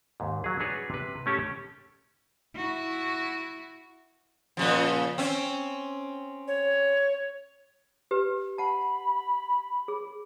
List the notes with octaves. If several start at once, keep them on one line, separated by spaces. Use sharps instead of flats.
D#2 G#2
F#3 G#4
D4 F#4 G#4 B4 C#5
C3 B4
A3 C#4 G4 A4
E4 F#4
A#2 C#3 F3
C4 C#4
C#5
G4 B4
F#5 A5 B5
G#4